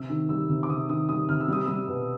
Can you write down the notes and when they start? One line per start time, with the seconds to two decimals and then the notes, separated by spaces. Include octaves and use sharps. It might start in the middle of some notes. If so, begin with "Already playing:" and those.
Already playing: C3 E6
0.10 D#3
0.29 G3 E6
0.49 C3
0.63 D6
0.69 C3 D#6
0.89 D#3 D#6
1.09 G3 D#6
1.29 C3 F6
1.40 E6
1.48 G3 D#6
1.65 G3 E6
1.88 B2